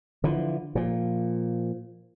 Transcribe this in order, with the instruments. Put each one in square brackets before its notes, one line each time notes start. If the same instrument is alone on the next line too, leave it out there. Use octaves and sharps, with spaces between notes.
[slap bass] D3 E3 F3
A#2 F3